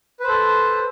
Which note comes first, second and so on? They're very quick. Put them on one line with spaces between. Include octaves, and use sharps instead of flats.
B4 C5 A4